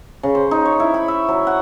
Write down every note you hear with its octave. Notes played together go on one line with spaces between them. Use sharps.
C#3
C5
D#4
C#5
E4
B5
E5
F#3
F#5